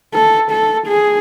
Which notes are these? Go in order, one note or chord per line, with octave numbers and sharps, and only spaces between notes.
A4
A4
G#4